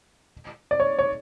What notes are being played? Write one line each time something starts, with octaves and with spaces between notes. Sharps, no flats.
D5
C#5
C#5